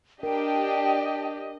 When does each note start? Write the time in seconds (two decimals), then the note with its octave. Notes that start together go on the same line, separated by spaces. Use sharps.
0.23 D4 G4 A#4 D#5 G5